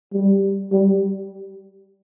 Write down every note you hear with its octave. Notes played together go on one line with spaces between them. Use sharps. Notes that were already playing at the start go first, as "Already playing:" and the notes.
G3
G3